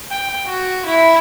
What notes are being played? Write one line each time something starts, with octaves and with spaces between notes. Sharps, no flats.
G5
F#4
E4